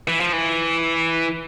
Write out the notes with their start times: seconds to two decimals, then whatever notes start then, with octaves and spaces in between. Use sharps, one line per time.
0.08 E3
0.20 F3
0.33 E3